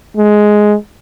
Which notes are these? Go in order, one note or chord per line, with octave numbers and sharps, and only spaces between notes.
G#3